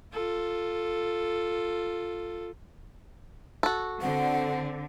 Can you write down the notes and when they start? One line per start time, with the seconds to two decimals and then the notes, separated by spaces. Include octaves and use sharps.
0.13 F4 A4
3.63 F#4 A4
4.02 D3 C4 F#5